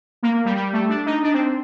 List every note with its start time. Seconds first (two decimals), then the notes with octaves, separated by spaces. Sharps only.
0.23 A#3
0.45 G3
0.56 G3
0.73 A3
0.89 D4
1.06 D#4
1.23 D4
1.34 C4